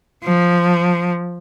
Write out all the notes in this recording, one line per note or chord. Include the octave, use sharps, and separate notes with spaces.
F3